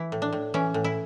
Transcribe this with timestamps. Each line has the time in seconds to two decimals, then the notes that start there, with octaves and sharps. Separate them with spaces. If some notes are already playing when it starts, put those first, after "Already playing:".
Already playing: E3 E4
0.12 A2
0.22 D4
0.33 A2
0.54 E3 C#4
0.74 A2
0.84 E4